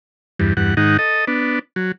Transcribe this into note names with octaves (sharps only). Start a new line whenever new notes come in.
E2 G2
E2 G2 F#5
G#2 D#3 D#4 F#5
A4 D#5
B3 D4
F#3